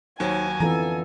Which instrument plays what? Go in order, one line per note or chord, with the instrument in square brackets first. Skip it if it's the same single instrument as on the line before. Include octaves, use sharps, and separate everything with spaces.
[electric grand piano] D#2 F#3 [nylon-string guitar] D#4 C5 C#5 [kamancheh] G#5
[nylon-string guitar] F2 D3 B3 [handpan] E3 A4 [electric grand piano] A#5